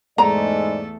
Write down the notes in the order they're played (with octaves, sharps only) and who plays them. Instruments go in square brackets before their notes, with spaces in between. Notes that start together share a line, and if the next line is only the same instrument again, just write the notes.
[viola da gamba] E2 A3 A4 [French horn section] G#2 G#3 D5 [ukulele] A#5